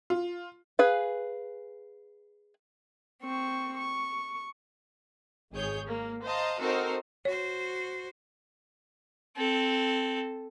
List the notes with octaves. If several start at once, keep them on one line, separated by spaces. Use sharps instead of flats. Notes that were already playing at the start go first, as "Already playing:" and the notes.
F4
G#4 B4 F5
C4 C#6
C#6
G#1 G#4 C#5 G6
A#3
C5 D#5 F5 A5 A#5
C4 D#4 F#4 A4 A#4 C5
F#4 C5 C#5
C4 A4